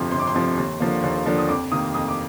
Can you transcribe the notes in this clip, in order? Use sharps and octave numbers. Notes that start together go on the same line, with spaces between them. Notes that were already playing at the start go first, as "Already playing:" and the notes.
Already playing: G1 F2 C3 F3 C6
G1 C6
D6
C6
F2 C3 F3
D#2
D3 F3 A#3
D#2
D3 F3 A#3
D#6
F2 D6
C3 D#3 A#3 D#6
F2 D#6
D6